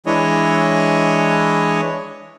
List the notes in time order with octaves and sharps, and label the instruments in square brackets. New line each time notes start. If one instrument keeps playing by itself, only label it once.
[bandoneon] E3 G#3 D4 E4 C#5 D#5